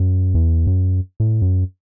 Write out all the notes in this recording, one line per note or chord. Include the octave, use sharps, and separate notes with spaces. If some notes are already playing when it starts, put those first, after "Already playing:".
Already playing: F#2
E2
F#2
A2
F#2